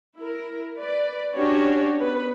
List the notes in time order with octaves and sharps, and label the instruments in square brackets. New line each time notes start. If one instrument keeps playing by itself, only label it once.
[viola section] E4 A#4
B4 D5
C#4 D4 F#4 G4 C#5 D5
B3 B4